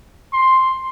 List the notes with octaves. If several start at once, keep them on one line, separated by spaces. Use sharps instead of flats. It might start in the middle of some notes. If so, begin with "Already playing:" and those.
C6